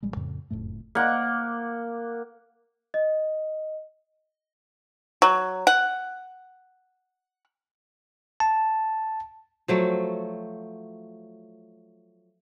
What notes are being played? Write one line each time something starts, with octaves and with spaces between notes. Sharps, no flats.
A1 G3 G#3
F2 A2 C#3
F#1 F2 A2 A3
A#3 F#5
D#5
F#3
F#5
A5
F3 F#3 A3